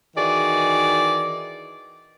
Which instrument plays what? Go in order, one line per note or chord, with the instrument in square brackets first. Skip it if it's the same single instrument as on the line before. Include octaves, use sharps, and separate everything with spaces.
[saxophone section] D#3 E3 F#4 G#4 D5